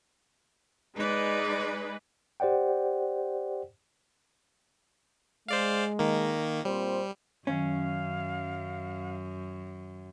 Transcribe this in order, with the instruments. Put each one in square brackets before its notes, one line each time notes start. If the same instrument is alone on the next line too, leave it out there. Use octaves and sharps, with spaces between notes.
[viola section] G#3 B4 [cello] D#4 D5
[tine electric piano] G4 C5 D5 F#5 G5
[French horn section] G#3 [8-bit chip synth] C5 D5 F5
[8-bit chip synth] D#3 A#3
[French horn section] A#2 C4 C5 [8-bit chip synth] G3
[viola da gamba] F#2 [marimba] D#3 F#3 [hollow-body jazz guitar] C#4 [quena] F5